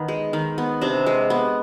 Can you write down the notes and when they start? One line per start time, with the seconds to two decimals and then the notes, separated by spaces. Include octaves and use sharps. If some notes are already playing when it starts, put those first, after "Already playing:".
Already playing: D#3 B3
0.08 G#3
0.33 D#3
0.58 B3
0.81 C3 D4
1.06 G#3
1.30 B3